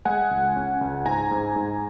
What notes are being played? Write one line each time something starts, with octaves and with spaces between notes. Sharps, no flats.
G#3 F#5 G#5
C#2
C#4
C#2
G#2 G#5 A#5
G#2
G#2